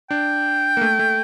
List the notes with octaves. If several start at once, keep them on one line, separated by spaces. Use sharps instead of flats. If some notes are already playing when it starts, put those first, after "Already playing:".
D4 G5
A#3
A3
A3